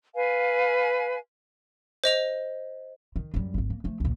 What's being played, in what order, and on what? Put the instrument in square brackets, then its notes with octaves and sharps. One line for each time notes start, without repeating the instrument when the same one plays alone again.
[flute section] B4 F5 G#5
[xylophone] C5 D#5 F7
[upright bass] D#3
F#2 G3
G#1 D2
A#3
F3 A3
A#1 D#2